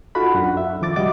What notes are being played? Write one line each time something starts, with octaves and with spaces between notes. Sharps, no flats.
D#4 F4 F#4 A4 F#5 B5
F#2 D4 F#5
E5
D#3 F3 D6 A6
C2 G3 F#4 D#5 D6 A6